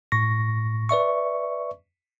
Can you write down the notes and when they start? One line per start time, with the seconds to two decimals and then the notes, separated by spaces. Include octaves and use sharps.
0.12 A2 C#6 A#6
0.89 B4 D5 E5 C#6